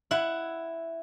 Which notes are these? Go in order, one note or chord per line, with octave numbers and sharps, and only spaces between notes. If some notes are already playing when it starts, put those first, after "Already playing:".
E4 F#5